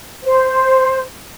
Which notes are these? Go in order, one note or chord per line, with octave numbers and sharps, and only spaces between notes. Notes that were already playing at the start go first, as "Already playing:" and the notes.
C5